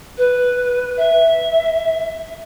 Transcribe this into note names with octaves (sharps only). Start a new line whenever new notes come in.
B4
E5